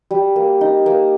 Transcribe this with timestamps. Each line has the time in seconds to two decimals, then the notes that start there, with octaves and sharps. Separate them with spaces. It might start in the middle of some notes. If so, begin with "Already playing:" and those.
0.11 G3
0.36 A#3
0.61 D#4
0.86 A#3